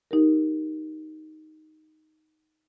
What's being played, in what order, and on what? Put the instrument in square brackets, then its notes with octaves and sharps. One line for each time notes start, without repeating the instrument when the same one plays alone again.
[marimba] D#4 G4 A#4